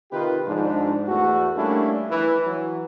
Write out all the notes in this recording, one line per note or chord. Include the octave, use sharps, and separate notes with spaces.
C3 D#3 D#4 F4 G4 B4
G#2 F3 D4
E2 A3 F#4
G3 A3 A#3 C#4 D4 E4
E3
E3 F#3